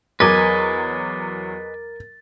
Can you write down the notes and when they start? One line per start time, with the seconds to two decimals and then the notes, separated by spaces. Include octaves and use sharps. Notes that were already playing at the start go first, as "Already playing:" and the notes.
0.20 E2 F#3 A#4 B4 D#5 G#5 D6 A6